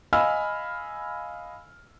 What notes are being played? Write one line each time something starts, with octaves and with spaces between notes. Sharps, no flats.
D#5 F5 G#5 B5 E6 F6